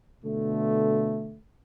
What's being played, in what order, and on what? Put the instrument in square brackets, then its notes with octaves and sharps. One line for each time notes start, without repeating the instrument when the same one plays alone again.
[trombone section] B2 D3 A3